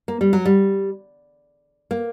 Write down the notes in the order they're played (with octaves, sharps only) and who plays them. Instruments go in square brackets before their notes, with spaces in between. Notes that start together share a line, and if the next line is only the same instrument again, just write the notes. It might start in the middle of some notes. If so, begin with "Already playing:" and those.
[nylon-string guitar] A#3
G3
F#3
G3
A#3